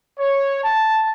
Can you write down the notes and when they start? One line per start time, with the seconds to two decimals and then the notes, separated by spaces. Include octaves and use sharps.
0.19 C#5
0.63 A5